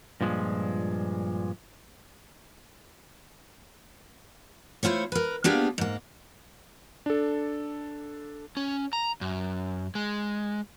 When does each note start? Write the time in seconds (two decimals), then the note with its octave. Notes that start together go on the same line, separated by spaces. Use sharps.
0.21 G2 A#2 F3 G#3
4.83 A3 E4 F4 C5 C#5
5.12 A#4 B4
5.44 A#3 B3 D4 F4 G4 G#4
5.78 G#2 A#3
7.06 D4 A4
8.57 C#4
8.93 A#5
9.21 F#2
9.95 G#3